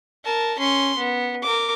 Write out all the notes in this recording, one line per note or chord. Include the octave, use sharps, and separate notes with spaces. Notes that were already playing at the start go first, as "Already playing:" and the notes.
A#4 A5
C#4 C6
B3
A#4 D6